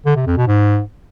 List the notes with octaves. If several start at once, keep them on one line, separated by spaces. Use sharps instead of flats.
D3
C3
F2
B2
G#2